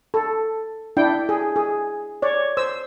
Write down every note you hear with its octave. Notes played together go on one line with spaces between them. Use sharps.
A4
D4 E4 G5
G#4
G#4
C#5 D5
C5 E6